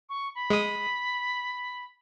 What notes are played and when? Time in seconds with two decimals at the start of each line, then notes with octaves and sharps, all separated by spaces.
0.09 C#6
0.35 B5
0.50 G#3 D#6